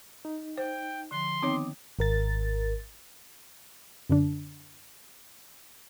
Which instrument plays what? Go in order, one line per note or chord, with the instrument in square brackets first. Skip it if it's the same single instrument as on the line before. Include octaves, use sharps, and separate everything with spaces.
[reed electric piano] D#4
[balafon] C5 [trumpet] G5
[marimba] D3 F3 [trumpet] C6
[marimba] D#3 B3 G5 [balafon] C4 D#4 C#5 [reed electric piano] D6 D#6
[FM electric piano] G#1 A#4 A6
[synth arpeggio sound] F#2 D3 D4